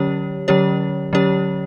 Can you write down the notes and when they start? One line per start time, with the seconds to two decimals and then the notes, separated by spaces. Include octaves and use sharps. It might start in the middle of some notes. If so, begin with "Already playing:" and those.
Already playing: D3 F#3 C#4 G4 C#5
0.48 D3 F#3 C#4 G4 C#5
1.13 D3 F#3 C#4 G4 C#5